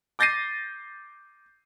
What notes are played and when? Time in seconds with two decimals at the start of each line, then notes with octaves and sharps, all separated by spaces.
0.19 D6 G6 A6 A#6 C7 D#7